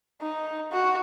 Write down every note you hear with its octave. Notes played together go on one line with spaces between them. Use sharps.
D#4
F#4